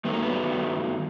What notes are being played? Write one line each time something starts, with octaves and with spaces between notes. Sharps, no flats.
G2 D#3 F#3 A3 B3
A#3
B3